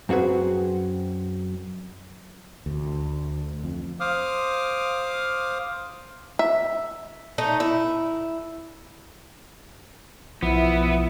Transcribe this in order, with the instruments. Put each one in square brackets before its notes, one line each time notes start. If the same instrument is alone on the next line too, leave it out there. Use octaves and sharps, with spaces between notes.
[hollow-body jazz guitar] F#2 C4 F#4 G#4 B4
[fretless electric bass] D2
F2
[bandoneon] C5 F5 D6 D#6 F6
[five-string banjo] E5
[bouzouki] A3 D#4
E4
[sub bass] B1 [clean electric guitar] F3 [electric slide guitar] B3 [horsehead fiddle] E4 E5